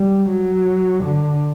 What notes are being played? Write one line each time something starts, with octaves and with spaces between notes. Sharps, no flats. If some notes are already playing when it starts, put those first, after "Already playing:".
Already playing: G3
F#3
D3